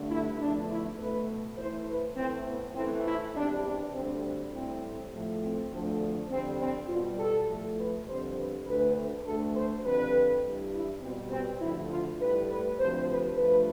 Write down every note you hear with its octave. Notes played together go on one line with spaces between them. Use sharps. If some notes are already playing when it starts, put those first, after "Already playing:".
Already playing: G2 D3 A3
E4
E2 D3 F3 A3 D4
E4
B2 A3 B4
A2 E3 A3 C5
B4
A2 E3 A3 C4
B3
A2 E3 A3 C4
E4
E2 C3 G3 D4
D4
D2 D3 G3 C4
A2 G3 C4
A2 F3 A3
C4
D2 D3 F3 A3
F2 D3 G3 C4
C4
B2 G3 F4
A4
A2 F3 A3
B4
F2 D3 G3 C5
B4
D2 D3 A3 B4
D2 D3 A3 A4
C5
F2 D3 G3 B4
G2 E3 G3
E4
B2 G3 C4
C4
D2 D3 F3 E4
F4
A2 G3 B4
B4
D2 C3 F3 C5
B4
G2 F3 A3 B4